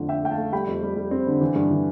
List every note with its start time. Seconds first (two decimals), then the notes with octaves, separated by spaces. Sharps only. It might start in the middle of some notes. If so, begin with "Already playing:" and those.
Already playing: F2 D3 A3
0.08 D4 E5 G5
0.23 A3 G5
0.31 F5 A5
0.37 A3
0.53 G3 G5 B5
0.67 F2
0.83 G3
0.97 G3
1.11 C4
1.27 D3
1.41 E3
1.55 G2
1.71 E3